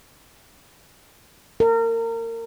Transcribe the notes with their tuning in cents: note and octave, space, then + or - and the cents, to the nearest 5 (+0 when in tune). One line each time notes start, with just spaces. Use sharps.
A#4 -30